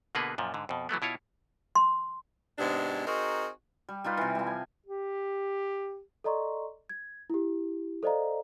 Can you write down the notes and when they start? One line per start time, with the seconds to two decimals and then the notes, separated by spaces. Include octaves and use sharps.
0.15 B2 D3 A#3 B3 G#4 B4
0.38 F#2 A#2 F3
0.54 G#2 D3
0.69 F2 B2
0.89 E3 F#3 A3 B3
1.02 B2 E4 F4 C#5
1.75 C6
2.58 G#2 C3 G#3 B3 D4
3.05 C4 D#4 F#4 G#4 A#4
3.89 G3
4.04 G3 D#4 F4 B4
4.17 C3 E3
4.35 F3 G3
4.47 G#5
4.86 G4
6.24 A4 D5 D#5 A#5 C6 C#6
6.90 G#6
7.30 E4 G4
8.03 A4 C5 D5 D#5 F5 A#5